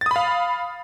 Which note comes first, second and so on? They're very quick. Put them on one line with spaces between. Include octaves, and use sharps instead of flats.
A6 D#6 B5 F5